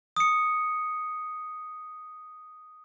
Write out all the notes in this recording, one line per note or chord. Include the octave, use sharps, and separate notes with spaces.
D#6 C#7